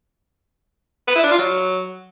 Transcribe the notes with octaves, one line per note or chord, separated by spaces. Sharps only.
B4
E4
D4
F4
F#3